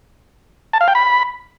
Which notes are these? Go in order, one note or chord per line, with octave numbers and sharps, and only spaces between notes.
A5
F5
G5
B5